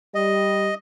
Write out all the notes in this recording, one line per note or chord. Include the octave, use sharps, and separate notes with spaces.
G3 D#5